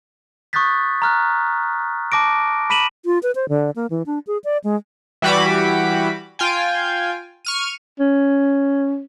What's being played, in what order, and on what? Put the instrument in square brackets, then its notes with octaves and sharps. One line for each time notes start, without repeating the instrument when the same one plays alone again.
[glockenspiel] C#6 D#6 F#6 G6 A6 B6
A#5 F6 F#6
A5 D6 A#6 D7
B5 B6 D#7 E7 F#7
[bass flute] F4
B4
C5
D3
A#3
E3
D4
G#4
D5
G#3
[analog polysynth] E3 G3 F#4 G4 B5 D6
F4 G5 G#5
C#6 F6 D#7
[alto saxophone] C#4